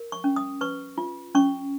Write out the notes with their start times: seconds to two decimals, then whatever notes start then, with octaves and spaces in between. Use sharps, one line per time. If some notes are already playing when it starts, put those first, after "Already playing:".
Already playing: A#4
0.12 C#6
0.24 C#4
0.36 D#6
0.61 B4 C#6
0.98 F4
1.35 C#4 C#6